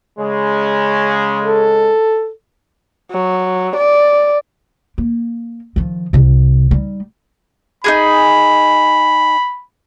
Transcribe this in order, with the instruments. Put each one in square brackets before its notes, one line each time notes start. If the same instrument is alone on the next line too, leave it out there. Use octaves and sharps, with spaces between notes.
[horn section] C#3 G#3
[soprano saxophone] A4
[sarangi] F#3
D5
[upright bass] A#3
D#3 F3
C2 C3
G3 D#4
[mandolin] D#4 F#4 G#4 [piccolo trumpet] B5